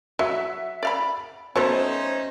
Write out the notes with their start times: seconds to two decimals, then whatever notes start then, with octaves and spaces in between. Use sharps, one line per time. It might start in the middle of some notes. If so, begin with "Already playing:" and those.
0.19 F#3 E5 F#5
0.83 D5 F5 B5
1.56 F#3 A3 B3 C#4 D#4 C5